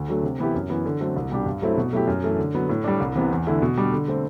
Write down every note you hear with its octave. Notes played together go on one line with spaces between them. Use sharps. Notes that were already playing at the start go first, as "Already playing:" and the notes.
Already playing: D2
D3 F#3 A3
C3
E3 B3 E4 G4
F#2
E3 B3
D3
F#3 A3 C4
C2
B2 G3 D4 G4
G2
F#3 A3 C4 E4
B2
F#3 A3 E4 G4
F#2
E3 A3
D3
F#3 B3
A2
G3 D4
C2
C3 E3 B3
E2
D3 A3 E4
B2
G3 D4
D3
A3 C4